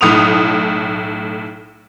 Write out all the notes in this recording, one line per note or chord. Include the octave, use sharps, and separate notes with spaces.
B1 A2 D#6 F7